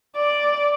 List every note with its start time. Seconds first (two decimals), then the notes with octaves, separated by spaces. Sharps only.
0.17 D5